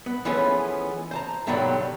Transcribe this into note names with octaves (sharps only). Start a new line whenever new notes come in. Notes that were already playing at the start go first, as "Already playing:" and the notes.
B3
E3 F3 G#3 A3 B3 C#4
C5 A5 A#5
G2 B2 D3 D#3 F#3 G3